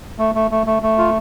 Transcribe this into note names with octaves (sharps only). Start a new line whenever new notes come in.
A3
A3
A3
A3
A3
F4